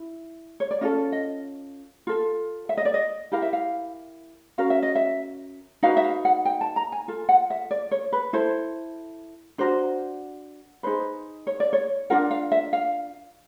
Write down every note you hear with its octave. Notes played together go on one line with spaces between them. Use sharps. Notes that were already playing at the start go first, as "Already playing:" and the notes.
Already playing: E4
C#5
D5
C#4 F4 A4 D#5
D#5
F4 A4
E5
D#5
D5
D#5
E4 G4 A#4 F5
E5
F5
C#4 F#4 A#4 F5
E5
D#5
E5
D#4 F#4 B4 F5
E5
F5
F#5
G5
A5
A#5
G#5
F4 A4
F#5
E5
D5
C#5
B4
E4 A4 C5
D4 F#4 A#4 C5
D#4 G#4 B4 C5
C#5
D5
C#5
D4 F4 A#4 F#5
F5
E5
F5